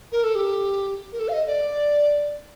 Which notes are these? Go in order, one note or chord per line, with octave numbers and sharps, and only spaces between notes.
A#4
A4
G4
A#4
A4
F5
D#5
D5